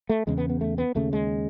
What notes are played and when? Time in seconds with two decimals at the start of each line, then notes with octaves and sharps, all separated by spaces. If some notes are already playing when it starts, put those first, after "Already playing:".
0.09 A3
0.27 E2 C#3 G#3
0.38 B3
0.50 B3
0.61 A3
0.78 B3
0.95 D#2 C#3 A3
1.13 G#3